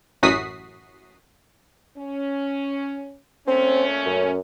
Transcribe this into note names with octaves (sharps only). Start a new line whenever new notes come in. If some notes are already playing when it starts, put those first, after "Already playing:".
A1 F#2 F#4 D#6 B6 C7
C#4
A#2 A3 C4 C#4
F#2